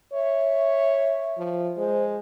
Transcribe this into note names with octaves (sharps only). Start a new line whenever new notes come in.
C#5 E5
F3
G#3 C5